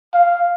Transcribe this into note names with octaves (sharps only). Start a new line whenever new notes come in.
F5